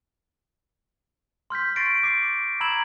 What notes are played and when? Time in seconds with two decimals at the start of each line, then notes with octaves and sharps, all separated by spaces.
1.50 C6 F6 G6 B6
1.76 C6 C#6 A6 A#6 C7 D7
2.03 D6 C7 D7
2.61 A#5 B5 E6 G#6 E7 F#7